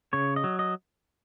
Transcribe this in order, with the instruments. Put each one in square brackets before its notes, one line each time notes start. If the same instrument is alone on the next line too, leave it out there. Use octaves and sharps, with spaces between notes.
[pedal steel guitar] C#3 C#5
D#5
F#3
D#5